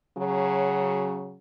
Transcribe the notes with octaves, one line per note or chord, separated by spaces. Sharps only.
C#3 F#3